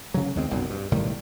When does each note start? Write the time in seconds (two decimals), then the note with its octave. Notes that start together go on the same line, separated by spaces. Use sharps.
0.14 C#3 F#3
0.36 D#2 G#3 C4
0.50 F1 B1 F#2 A#2
0.70 G2
0.91 B1 A2 D#3 G3